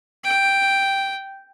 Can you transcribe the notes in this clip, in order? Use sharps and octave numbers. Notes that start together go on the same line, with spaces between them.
G5